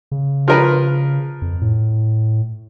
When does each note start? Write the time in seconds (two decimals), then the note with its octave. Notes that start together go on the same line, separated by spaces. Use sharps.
0.11 C#3
0.48 F3 A#4 B4
1.42 F2
1.61 A2